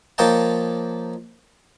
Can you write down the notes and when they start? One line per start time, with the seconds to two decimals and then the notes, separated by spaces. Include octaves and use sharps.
0.18 F3 A#3 C#5 D#5 G5 A5